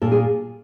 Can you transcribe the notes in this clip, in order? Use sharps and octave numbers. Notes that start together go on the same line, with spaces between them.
A#2 A4
G#4